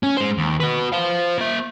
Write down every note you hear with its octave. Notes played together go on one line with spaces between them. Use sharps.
C#4
G#3 C5
D#2
F#4 B4
C5 F5
A#3 E5